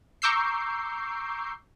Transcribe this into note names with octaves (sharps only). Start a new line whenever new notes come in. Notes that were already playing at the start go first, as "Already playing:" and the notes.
A#5 C#6 D6 E6 G6 C7